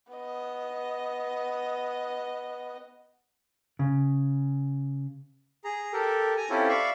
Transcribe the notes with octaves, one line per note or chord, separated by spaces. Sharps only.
B3 D#5
C#3
G#4 A#5
G4 A4 A#4
G#5 A#5
C4 C#4 E4 F4 G4 A4
D5 E5 F5 B5 C#6